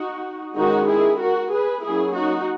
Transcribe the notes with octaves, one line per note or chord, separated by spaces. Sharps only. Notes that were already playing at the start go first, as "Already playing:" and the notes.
Already playing: D#4 F#4
D#3 G#3 C#4 D#4 F#4
E4 G#4
F#4 A#4
G#4 B4
F#3 A#3 C#4 E4 G#4
D#4 F#4